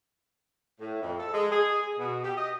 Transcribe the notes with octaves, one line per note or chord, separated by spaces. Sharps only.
A2
F2
A4
G#3
G#4
B2
G4
D#5